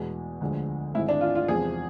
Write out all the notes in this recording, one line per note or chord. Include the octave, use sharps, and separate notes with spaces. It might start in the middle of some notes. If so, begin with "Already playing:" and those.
Already playing: E2 B2 G#3
D2 D3 F3 G#3
G#1 G#2 G#3 E4
D4
F4
F4
E2 C3 F3 G#3 G#4